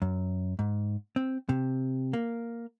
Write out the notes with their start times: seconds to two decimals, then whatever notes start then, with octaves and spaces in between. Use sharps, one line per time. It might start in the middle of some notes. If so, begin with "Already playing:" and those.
0.02 F#2
0.59 G#2
1.16 C4
1.49 C3
2.13 A#3